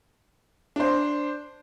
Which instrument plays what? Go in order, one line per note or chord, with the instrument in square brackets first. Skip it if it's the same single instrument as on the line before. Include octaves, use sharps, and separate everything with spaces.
[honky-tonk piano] D4 C5